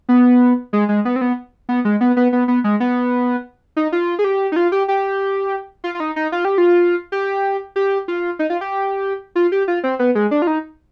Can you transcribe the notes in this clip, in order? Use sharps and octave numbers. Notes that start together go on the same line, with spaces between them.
B3
G#3
G#3
B3
C4
B3
B3
G#3
B3
B3
B3
B3
G#3
B3
D#4
F4
G#4
G4
D#4
F4
G4
G4
F4
F4
D#4
D#4
F4
G4
F4
G4
G4
F4
D#4
F4
G4
F4
G4
F4
C4
B3
G#3
D4
F4
D#4